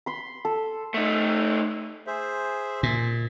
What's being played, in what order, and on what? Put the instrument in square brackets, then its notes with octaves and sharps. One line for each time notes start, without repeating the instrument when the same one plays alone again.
[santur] B5 C6
A4
[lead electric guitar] A3 D#4
[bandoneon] G#4 C5 E5
[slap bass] A#2